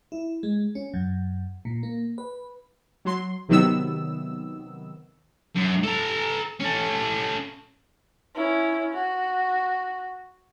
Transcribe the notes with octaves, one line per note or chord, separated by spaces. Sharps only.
E4
G#3
C#4
F#2
A#2
A#3
B4
F#3 C6
C3 D#3 F#3 B3 E6
F#2
A4 A#5
C#4 A4
C#4 E4
F#4